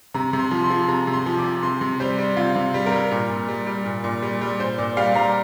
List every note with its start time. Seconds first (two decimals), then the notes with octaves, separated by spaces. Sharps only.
0.14 C3 A#5
0.33 C3
0.39 C6
0.51 F3
0.64 C6
0.70 F3
0.88 C3 A#5
1.07 C3
1.13 C6
1.26 F3
1.39 D6
1.44 F3
1.62 C3 C6
1.81 C3
2.00 G3 C5
2.19 G3
2.37 C3 F4
2.55 C3
2.74 G3
2.86 A#4
2.92 G3
3.11 A#2
3.30 A#2
3.48 G3
3.67 G3
3.86 A#2
4.04 A#2
4.22 G3
4.41 G3
4.60 A#2 C5
4.78 A#2 D5
4.97 G3 F5
5.15 G3 A#5